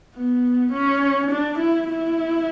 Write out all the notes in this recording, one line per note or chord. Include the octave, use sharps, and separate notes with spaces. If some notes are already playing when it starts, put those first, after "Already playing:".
B3
C#4
D4
E4
E4